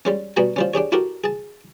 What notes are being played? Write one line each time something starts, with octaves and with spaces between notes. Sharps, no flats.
G3 G#3 C#4
B2 G3 F#4 G#5 A#5
F3 G3 C#4
D4 G4 G#4 C#5
E4 F#4 G4 A4 A#4
G#4 A5